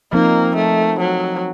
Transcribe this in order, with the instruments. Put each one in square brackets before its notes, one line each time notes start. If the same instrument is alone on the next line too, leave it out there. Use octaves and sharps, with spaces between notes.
[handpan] F3 C4 D#4 A#4 [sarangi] A#3
[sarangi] A3
F#3